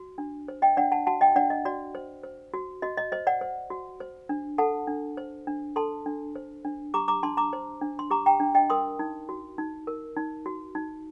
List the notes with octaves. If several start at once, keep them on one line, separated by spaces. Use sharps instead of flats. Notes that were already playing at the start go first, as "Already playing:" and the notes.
Already playing: F#4
D4
C5
D#5 G5
D4 D5 F#5
F#5 A5
F#4 F#5 A5
D#5 G5
D4 D5 F#5
D#5
F#4 D5
C5
C5
F#4
F#4 D#5
D#5
C5 D#5
D5 F#5
C5
F#4
C5
D4
A4 F#5 A5
D4
C5
D4
A4 A5 C6
D4
C5
D4
G4 A#5 D6
A#5 D6
D4 A5 C6
A#5 D6
C5
D4
C6
G4 A#5 D6
G5 A#5
D4
D#5 G5
A#4 C6 D#6
D#4
F#4
D#4
A#4
D#4
F#4
D#4